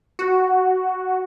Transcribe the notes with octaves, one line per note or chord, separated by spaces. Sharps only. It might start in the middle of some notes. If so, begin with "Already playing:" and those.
F#4